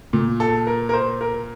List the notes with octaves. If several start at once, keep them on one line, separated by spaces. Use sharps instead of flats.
A#2
A4
A#4
A#4
C5
A#4